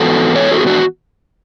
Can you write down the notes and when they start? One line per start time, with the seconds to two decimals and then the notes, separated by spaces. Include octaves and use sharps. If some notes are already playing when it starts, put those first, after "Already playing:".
Already playing: G#2 E3 B3 F#4 A4
0.35 A4 C#5
0.51 F#4 A4
0.60 G#4
0.67 D4 F#4